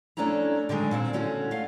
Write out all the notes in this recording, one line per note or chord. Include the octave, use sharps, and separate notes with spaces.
F2 A3 C#4 D4 E4 A#5
D3 D#3 F#3 G#3
A#2 C4 E4
D3 A3 C#4 F#4
A3 F5